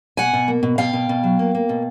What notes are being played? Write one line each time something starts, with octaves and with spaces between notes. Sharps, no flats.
B2 F#5 G#5
B2
A#3
B2
B2 F5 G5
B2
B2
F#3
A#3
A#3
B2